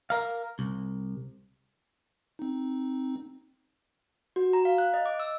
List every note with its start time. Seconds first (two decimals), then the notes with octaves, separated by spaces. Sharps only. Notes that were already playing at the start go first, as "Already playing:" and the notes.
0.10 A#4 F5
0.59 C2
2.39 C4 D#4
4.36 F#4
4.53 A#5
4.65 F5
4.78 F#6
4.94 D#5
5.06 D6
5.20 E6